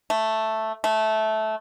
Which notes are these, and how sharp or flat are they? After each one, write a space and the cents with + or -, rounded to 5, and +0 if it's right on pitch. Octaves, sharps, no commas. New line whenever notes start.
A3 +0
A3 -15